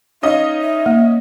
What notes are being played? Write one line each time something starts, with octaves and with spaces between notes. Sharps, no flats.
C#4 D#4 D#5 F5
E5
A#3